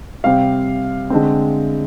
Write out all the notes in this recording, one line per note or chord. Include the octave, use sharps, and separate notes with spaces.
C3 G3 C4 F5
D3 G#3 C4